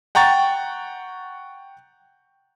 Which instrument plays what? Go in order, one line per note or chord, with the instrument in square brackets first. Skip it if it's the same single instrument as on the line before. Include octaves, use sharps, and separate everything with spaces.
[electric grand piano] F#5 G5 A#5 C#6 A6